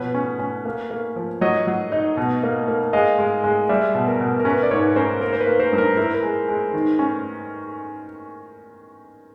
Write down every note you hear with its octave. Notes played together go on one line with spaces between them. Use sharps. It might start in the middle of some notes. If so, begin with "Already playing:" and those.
Already playing: B2 F3 B4 C#5
C#4
C#4
A#3
A#3
F3
F#3 C#5 D#5
F#3
D#4
B2
A#3
A#3
G#3 D#5 F5
G#3
G#3
G3 D5 E5
B2
A#4
B2
A#4
C#4 B4
D5
G#2 B4 C#5
C#4 A#4 C5
A#3 A#4
C5
B4
A#3
A#4 C5
G2
A#4
E4 A#4
A#4
G#3
G#3
D#3
C#4